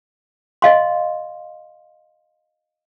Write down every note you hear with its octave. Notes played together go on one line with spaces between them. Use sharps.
D#5 F5 C6